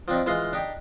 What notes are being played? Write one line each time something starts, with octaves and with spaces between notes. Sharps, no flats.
F3 C4 D4 D#4
E3 G#3 F4 D#5 F5
D4 D#4 G4